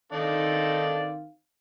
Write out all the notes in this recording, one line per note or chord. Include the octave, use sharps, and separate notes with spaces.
D#3 C4 D#4 A4 D5 F5